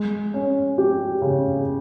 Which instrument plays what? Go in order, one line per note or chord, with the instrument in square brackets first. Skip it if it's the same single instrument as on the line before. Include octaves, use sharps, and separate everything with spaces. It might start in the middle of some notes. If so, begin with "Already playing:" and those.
Already playing: [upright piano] G#3
C#4
G4
C#3